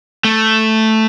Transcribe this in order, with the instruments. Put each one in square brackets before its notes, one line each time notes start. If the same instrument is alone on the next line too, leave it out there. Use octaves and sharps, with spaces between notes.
[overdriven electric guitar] A3